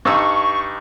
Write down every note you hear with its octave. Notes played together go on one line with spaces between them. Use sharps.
G2 D#4 C#6 E6